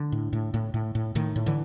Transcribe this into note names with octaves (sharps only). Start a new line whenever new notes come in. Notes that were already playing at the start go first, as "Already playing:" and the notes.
Already playing: D3
A2
A2
A2
A2
A2
A2 D#3
A2
D3 E3